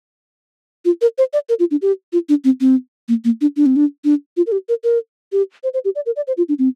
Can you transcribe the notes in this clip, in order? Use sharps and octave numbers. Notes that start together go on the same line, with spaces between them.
F4
A#4
C5
D5
A#4
F4
D4
G4
F4
D4
C4
C4
A#3
A#3
D4
D4
C4
D4
D4
F4
A#4
G4
A#4
A#4
G4
C5
C5
G4
D5
A#4
D5
C5
F4
D4
C4